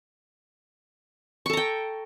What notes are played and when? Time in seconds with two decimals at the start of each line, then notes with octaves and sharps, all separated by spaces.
1.46 C#6
1.50 A4
1.53 A#5
1.57 G5